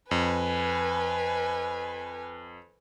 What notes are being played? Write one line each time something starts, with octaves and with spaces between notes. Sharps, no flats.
F2 B4 G#5